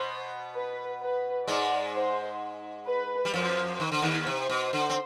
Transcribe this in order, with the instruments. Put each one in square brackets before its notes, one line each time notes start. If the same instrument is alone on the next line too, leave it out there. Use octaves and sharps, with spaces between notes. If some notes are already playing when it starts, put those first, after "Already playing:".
Already playing: [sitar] B2 B3 [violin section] C5
[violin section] B4
B4
[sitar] G#2 G#3 [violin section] D5
[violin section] C5
B4
[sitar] G3
[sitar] F2 F3 [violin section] C5
[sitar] D#3
D3
D#2 D#3
[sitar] C3 [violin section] C5
[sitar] B2
D3
C4